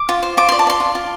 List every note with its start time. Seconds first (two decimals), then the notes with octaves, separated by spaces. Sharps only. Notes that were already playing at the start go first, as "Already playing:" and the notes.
Already playing: D6
0.09 F4
0.23 C5
0.37 F4 D6
0.49 D5 C6
0.59 A5
0.67 D5 C6
0.80 F4
0.95 F4